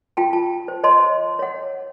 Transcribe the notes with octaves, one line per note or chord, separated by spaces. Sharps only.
F4 G5 A5
A5
C5
C#5 D#5 A5 C6
C#5 F#5